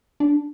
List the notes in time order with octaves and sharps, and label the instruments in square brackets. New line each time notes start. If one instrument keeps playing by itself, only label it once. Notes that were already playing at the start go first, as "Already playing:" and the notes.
[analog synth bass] D4